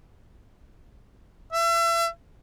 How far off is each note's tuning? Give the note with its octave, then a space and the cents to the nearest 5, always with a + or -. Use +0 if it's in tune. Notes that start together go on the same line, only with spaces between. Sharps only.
E5 +35